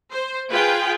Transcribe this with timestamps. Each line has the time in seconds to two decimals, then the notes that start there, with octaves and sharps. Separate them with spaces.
0.11 C5
0.50 F4 G#4 B4 G5